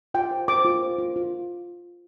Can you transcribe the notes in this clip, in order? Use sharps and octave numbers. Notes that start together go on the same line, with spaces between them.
F4 G5
C5
C5 D6
F4
C5
F4
F4